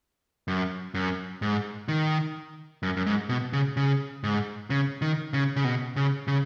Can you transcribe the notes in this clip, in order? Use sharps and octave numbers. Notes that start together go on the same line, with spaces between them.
F#2
F#2
G#2
D#3
F#2
F#2
G#2
B2
C#3
C#3
G#2
C#3
D#3
C#3
C#3
B2
C#3
C#3